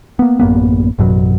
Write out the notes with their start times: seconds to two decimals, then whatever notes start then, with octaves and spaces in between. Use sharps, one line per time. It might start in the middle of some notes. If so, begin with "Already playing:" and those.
0.19 A#3 B3
0.40 A1 F#2 A#3 B3
0.98 A1 F#2 B2 F#3